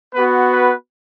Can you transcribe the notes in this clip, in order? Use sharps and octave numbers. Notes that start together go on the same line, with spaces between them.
B3 F#4 B4
B4